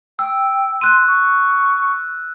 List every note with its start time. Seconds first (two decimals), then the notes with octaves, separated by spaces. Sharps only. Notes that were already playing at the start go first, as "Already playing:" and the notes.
0.19 G5 E6
0.81 C6 F#6 D#7
1.07 C#6